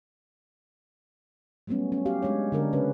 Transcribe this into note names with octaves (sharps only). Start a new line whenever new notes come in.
F#3 G3 A3 B3 C#4
C#4
F#4 G4 F5
G#3 D4 C#5
D3 D4 A#4
C#3 C#4 B4